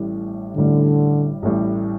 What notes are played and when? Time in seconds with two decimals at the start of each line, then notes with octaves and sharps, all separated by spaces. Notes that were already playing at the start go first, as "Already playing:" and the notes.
Already playing: A1 A2 G3
0.57 A1 A2 D3 G3
1.42 A1 A2 G3